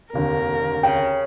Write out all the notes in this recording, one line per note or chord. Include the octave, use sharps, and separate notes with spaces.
F1 D#2 D3 A#4
C#3 G5